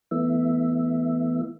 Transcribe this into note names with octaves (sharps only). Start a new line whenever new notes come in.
E3 A3 B3 E4 E5